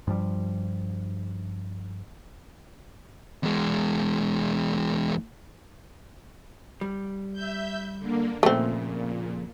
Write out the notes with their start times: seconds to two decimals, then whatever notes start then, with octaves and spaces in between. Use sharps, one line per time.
0.07 G2 F3 G3
3.43 E2 G#3
6.81 G3
7.33 E5 G6
7.99 D3 A#3
8.43 F2 A#2 C#3 A3 C4